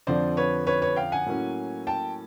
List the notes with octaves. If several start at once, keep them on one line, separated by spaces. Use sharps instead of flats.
F2 D3 F3 C5 D5
B4 C#5
B4 C#5
B4 C#5
F5 G5
F#5 G#5
A2 F#3 A#3 C#4
G5 A5